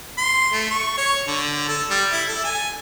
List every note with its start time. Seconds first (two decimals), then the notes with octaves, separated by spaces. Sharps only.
0.18 C6
0.53 A3
0.71 C#6
0.98 C#5
1.28 D3
1.68 A4
1.90 G3
2.12 E4
2.29 A4
2.44 G#5